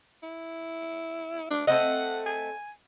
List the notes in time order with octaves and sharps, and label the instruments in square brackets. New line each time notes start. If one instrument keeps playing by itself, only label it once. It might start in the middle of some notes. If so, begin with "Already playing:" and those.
[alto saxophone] E4
D4
[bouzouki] A3 C4 D#5 [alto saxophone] F#5
[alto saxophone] G#5